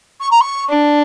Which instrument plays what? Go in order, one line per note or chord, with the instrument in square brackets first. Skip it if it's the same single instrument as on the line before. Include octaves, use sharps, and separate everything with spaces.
[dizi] C#6
A#5
C#6
[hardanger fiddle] D4